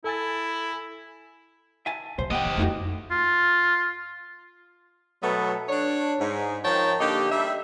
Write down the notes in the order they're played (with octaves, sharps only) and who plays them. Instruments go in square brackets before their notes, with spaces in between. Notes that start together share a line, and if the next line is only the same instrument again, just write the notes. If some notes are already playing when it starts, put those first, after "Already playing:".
[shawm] E4 [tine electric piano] A4 G#5 A6
[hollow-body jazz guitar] E5 G#5 A5
[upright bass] C3 D#4 [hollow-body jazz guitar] C5
[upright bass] C#3 [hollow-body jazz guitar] A#3 F#5 G5 [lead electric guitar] G4 D#5
[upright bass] C3
[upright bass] F2 [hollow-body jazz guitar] A3 D#4 F#4
[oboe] F4
[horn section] B2 F#3 A3 B3
D4 C#5
G#2
D#3 F3 C#5 G5 A5
D3 A#3 D#4 G4
G3 D#4 E5